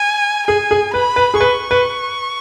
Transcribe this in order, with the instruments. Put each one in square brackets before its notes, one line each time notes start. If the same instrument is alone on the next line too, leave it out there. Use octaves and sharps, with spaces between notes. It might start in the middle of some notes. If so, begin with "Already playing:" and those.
Already playing: [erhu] G#5
[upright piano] G#4 [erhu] G#5
[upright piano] G#4
[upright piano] B4 [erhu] B5
[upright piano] B4
G#4
[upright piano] B4 [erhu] C#6
[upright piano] B4